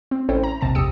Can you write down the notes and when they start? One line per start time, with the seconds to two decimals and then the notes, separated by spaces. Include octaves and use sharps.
0.11 C4
0.29 A1 C#4 E4 A4 C5 G5
0.43 A#5
0.61 A#1 D#2 C3 A5 A#6
0.75 A#1 F2 G4 D#6 E6 C#7